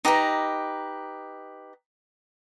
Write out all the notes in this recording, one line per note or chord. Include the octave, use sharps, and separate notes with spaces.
D#4 G4 B4 A#5